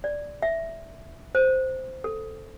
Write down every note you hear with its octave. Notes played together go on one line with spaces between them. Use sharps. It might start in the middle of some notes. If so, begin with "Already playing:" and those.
D5
E5
C5
A4